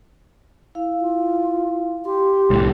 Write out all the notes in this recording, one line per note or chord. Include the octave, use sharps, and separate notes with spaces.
E4 F5
F4
G4 C6
C2 A2